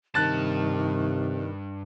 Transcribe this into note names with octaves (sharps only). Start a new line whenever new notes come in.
G2 C3 D#3 A5 F#6 A6